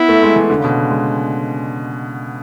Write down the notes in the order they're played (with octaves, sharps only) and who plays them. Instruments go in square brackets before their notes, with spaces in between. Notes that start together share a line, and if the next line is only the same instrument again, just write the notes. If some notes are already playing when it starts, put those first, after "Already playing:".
Already playing: [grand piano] B3 [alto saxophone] E4
[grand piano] A3
G#3
E3
D3
C#3
B2
G#3